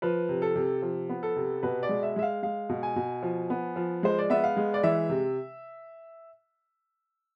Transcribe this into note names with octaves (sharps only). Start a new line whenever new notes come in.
F3 B4
C3
A4
C3
F3
B3
A4
C3
B2 B4
D5
G#3
E5
G#3 E5
F5
G#3 F5
B2
G#5
B2
F3
B3
F3
G#3 C5
D5
B3 E5
F5
G#3
D5
E3 E5
C3